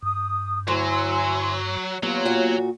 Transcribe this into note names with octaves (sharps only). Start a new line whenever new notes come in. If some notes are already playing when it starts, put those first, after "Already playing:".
G2 D#6
D2 F#3 E4 G#5 C6
E2 F#3 A#3 B3 F4 G4 C#5
A#2 F#4